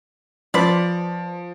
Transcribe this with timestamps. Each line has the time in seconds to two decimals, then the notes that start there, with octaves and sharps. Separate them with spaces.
0.54 F3 B4 C5 D5